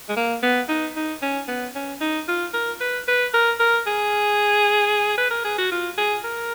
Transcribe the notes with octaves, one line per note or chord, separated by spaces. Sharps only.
G#3
A#3
B3
D#4
D#4
C#4
B3
C#4
D#4
F4
A#4
B4
B4
A#4
A#4
G#4
B4
A#4
G#4
F#4
F4
G#4
A#4